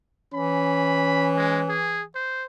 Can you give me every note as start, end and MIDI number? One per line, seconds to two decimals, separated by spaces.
0.34 2.13 52
0.34 1.77 61
0.34 1.30 83
1.37 1.60 56
1.69 2.03 68
2.15 2.45 72